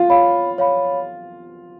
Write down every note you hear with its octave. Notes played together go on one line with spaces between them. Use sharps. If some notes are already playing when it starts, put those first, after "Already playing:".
Already playing: F4
C#5 F5 B5
C#5 F5 B5